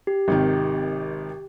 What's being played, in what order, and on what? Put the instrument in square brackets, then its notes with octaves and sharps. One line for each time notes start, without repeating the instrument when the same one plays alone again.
[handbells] G4
[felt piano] G#1 C3 D#3